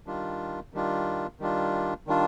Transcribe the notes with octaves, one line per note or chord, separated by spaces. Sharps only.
D#3 G3 D4 F4
D#3 G3 D4 F4
D#3 G3 D4 F4
D#3 G3 D4 F4